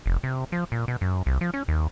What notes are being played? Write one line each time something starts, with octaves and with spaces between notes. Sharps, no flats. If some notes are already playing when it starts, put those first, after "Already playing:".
F1
C3
F3
A#2
B2
F#2
C2
F3
C#4
D#2